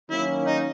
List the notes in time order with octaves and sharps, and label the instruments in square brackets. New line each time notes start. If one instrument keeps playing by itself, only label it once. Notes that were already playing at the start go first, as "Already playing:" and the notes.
[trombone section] D#3 F#3 A#3 C#4 [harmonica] E4
[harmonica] D#4